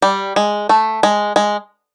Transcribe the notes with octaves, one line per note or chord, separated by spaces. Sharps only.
G3
G#3
A3
G#3
G#3